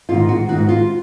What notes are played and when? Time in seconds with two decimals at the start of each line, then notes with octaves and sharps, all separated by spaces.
0.09 G#2 F4
0.14 D#3
0.29 F#4
0.49 G#2 D#3 F#4
0.69 F4